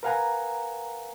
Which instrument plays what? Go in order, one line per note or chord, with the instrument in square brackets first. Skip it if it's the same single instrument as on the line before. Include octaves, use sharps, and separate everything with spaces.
[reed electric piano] A#4 B4 F5 F#5 G#5 A#5